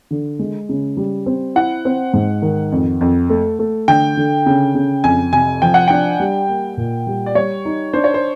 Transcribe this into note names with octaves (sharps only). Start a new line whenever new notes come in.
D3
G#3
C#3
G3
C4
E4 F#5
C4
G#2
D#3
F2
F2
A3
A3
D3 G5
D3
C#3
C#3
F2 G#5
C3 G#5
F3 G5
F#5
D4 G5
G3
A#3
A#2
G3
D5
G3 C#5
D#4
D4 C5
C#5
C5